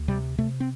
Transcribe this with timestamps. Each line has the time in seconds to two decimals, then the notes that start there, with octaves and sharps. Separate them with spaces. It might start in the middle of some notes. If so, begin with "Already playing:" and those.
Already playing: D2
0.08 C3 G3
0.38 C3 A3
0.60 C4